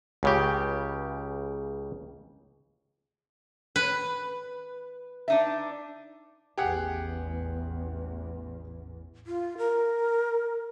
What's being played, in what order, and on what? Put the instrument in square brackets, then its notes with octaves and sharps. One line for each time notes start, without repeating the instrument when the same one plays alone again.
[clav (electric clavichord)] C#2 C#3 G4
[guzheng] B4
[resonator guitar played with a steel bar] D4 D#4 E5
[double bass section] A1 E2 [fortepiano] G4 G#4 F#5
[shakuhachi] F4
A#4